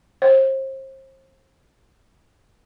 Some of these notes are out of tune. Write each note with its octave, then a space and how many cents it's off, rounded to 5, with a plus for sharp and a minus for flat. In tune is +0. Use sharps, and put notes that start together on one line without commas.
C5 +35